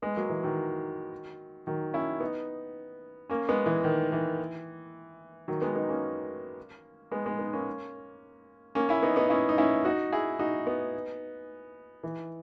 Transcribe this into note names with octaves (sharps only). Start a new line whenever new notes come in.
G#3 B3
F#3 A#3
E3
D#3 F#3
D#3 F#3
C#4 E4
B3 D#4
A#3 C#4
G#3 B3
E3
D#3
E3
D#3 F#3
G#3 B3
B3 D#4
A#3 C#4
G#3 B3
G#3 B3
B3 D#4
A#3 C#4
A#3 C#4
C#4 E4
B3 D#4
B3 D#4
C#4 E4
D#4
C#4 E4
D#4 F#4
E4 G#4
D#4 F#4
B3 D#4
E3